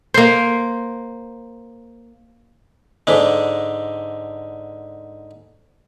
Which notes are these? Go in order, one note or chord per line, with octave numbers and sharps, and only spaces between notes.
A#3 C5
G#2 D3 G#3